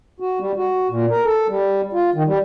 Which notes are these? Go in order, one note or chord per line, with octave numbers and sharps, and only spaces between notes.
F#4
G3
F#4
A#2
A#4
A4
G3
F4
D#3
G3